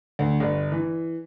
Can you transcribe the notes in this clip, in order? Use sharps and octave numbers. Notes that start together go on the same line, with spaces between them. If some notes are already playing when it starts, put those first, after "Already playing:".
D2
G1
E3